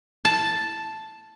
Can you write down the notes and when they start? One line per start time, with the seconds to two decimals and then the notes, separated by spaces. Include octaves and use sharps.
0.25 A5